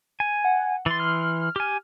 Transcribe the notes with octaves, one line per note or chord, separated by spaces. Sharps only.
G#5
F#5
E3 C6 A6
F6
G4 G#5